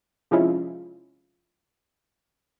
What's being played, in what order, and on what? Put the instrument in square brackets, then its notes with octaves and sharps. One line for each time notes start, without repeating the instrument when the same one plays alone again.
[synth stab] C3 F3 G#3 C#4 E4 F4